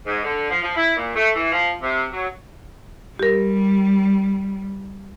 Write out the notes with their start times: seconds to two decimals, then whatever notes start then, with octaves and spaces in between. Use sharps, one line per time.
0.06 G#2
0.24 D3
0.50 F3
0.62 F3
0.76 E4
0.97 A#2
1.15 A3
1.35 E3
1.52 F3
1.82 C3
2.11 F#3
3.19 G3 G4 A#4